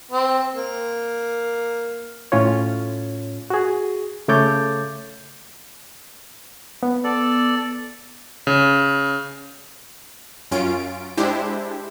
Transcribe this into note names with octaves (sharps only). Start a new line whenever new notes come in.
C4
A#3
A2 C#4 F4 C#5
F#4 G#4
C#3 A3 C#5 D6 G6 A6
B3
A4 D5
C#3
F#2 C#4 F4 D7
G#3 D4 E4 G4 C5